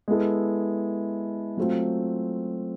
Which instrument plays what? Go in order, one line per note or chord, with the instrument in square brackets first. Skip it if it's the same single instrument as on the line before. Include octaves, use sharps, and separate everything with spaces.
[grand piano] G#3 B3 E4 A4
F#3 A3 C4 F4